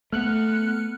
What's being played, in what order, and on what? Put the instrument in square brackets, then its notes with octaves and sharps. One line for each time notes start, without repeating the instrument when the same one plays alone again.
[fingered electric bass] A3 [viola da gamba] B3 [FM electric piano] F6 F#6 C#7